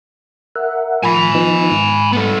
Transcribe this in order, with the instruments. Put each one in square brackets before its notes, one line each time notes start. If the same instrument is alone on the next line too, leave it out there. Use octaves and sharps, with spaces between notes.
[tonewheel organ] A#4 E5 F#5
[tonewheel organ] A2 F3 [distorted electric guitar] G#5 B5
[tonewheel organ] F3 B3 D#4
G#2
[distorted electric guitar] B3 A4